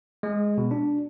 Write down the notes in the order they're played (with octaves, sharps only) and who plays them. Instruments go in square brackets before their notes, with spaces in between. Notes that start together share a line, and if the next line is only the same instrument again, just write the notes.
[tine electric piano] G#3
B2
D4